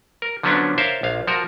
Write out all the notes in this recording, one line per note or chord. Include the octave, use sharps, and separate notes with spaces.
A#4
D3 F3 F#3 B3 C#4 D4
A#4 C5 C#5 E5 F5 A5
A#1 F5
F3 F#4 A#4